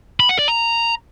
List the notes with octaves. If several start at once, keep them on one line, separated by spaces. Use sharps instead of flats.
B5
F#5
D5
A#5